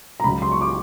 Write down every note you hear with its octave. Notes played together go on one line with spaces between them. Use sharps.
A#5
C#2 C#3 F#3 B5
C6
C#6
D6